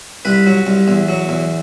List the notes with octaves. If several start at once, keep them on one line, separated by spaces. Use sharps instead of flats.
C2 B4
F#3
C2
E2
F#3
E2